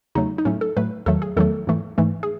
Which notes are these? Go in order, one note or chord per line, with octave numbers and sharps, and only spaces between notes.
E2 C#3 F#3 A3 D#4
D#4
A2 F#3 A3 C#4
A4
A2 F#3 A3 B4
E2 D#3 F#3 A3 A4
G#4
E2 D#3 F#3 A3 A4
G#2 E3 A3
G#2 E3 A3
G#4